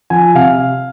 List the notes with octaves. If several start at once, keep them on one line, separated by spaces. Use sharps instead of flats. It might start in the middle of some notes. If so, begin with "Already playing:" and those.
F3 G#5
C3 F5